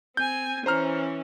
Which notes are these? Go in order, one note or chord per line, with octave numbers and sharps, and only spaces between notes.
C4 G#5 G6
E3 C#4 C5 A#5 F6